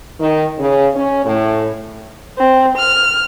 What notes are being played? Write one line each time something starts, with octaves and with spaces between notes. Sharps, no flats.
D#3
C#3
C#4
A2
C4
F6